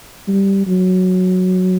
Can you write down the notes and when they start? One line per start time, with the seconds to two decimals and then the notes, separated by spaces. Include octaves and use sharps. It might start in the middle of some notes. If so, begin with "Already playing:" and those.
0.28 G3
0.67 F#3